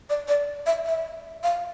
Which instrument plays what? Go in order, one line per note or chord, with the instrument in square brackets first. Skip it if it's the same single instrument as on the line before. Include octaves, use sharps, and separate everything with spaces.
[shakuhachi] D5
D5
E5
E5
F5